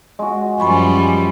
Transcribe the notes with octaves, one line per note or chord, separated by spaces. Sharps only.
G#3 F#4
F#2 F3 G3 G#5 B5 C#6